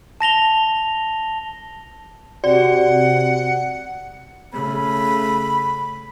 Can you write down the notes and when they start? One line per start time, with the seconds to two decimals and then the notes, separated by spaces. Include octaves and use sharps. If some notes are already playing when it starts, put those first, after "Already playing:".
0.21 A5 A#6 F7 G7
2.44 C3 F#4 G4 D5 F#5
4.53 C#3 A3 B5